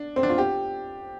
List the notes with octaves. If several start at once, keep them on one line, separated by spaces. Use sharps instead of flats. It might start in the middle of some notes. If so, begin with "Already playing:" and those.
Already playing: D4
C4
D4
F4
G4